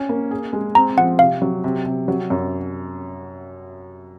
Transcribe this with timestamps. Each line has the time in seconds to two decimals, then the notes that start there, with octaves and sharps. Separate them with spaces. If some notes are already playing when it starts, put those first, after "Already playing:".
Already playing: C#4
0.09 A#3
0.31 G#4
0.53 G#3
0.75 C4 A#5
0.97 F3 F#5
1.19 C3 F5
1.42 F#3
1.64 C3
1.86 C3
2.08 F#3
2.30 F#2